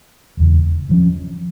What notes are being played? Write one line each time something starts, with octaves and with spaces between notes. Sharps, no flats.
E1 E2 C#3
G2 F3 C#4